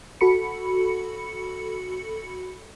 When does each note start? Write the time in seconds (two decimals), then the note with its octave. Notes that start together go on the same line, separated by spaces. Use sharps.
0.21 F#4 A4 B5 C#7